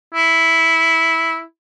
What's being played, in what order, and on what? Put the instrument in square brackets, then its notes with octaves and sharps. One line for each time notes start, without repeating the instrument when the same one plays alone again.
[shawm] E4